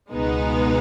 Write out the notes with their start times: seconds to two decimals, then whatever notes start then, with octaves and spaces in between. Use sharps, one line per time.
0.12 C#2 B2 G#3 B3 D#4